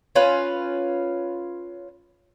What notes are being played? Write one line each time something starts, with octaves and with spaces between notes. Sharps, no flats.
C#4 F4 B4